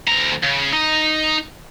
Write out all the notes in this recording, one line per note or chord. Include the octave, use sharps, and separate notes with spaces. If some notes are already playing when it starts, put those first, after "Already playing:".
D2 A#5
C#3
D#4